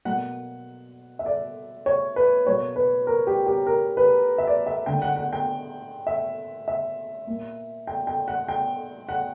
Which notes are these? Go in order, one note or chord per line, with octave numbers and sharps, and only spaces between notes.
B2 F#3 A#3 F#5
E5
D5
C#5
B4
B2 F#3 A#3 C#5
B4
A#4
G4
G4
A#4
B4
E5
D5
E5
D3 A#3 G5
F#5
F#5
G5
E5
E5
A#2 A#3
G5
G5
F#5
G5
F#5